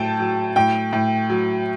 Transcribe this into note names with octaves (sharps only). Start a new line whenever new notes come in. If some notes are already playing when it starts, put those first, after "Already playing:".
Already playing: A2 F#3 G5 A5
F#3
A2 G5
A2
F#3